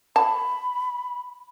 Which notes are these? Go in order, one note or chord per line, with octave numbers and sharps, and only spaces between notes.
A5 B5